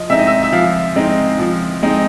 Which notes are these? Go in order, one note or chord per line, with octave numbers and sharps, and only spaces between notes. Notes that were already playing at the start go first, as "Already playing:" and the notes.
Already playing: F3 D#5
G#3 C4 D#4 E5
D#5
E5
E5
F3 F5
G#3 C4 D#4
F3
G#3 C4 D#4